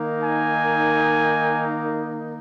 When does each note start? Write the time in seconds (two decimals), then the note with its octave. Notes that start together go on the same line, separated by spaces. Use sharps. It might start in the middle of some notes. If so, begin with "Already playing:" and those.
Already playing: D#3 A#3 D#4
0.24 G#5